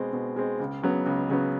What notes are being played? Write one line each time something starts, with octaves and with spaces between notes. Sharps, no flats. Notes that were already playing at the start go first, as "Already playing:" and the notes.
Already playing: B2 G#3 C4
B2
G#3 C4
C#2
C#3 F#3 B3
C#2
C#3 F#3 B3